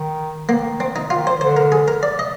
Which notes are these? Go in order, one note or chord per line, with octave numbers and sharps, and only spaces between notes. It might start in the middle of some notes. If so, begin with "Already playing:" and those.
Already playing: D#3
D#3 A#3
C4
D#4
D#3 F4
C5
D3 C5
A#4
G#4
A#4
D5
D#5